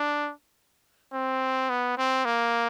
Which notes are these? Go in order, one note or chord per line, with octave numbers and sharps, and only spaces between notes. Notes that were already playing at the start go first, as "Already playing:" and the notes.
Already playing: D4
C4
B3
C4
A#3